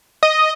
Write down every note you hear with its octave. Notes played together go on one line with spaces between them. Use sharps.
D#5